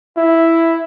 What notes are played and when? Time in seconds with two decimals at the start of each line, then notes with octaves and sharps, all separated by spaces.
0.17 E4